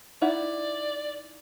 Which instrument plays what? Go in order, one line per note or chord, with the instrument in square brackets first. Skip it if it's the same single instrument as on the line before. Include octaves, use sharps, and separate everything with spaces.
[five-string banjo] D#4 E4 F#5 [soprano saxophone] D5